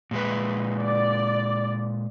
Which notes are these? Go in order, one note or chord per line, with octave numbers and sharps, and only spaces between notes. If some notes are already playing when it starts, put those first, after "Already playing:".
A#2 G#3 B4
D5